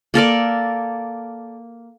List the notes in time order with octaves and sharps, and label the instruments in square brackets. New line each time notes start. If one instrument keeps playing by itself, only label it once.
[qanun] A#3 A4 A#4 D5